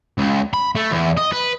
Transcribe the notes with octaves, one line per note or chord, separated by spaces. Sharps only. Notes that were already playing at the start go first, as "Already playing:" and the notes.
C#2
B5
A3
E2
D#5
B4